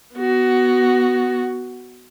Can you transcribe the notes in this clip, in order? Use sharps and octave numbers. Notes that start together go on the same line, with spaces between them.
B3 F#4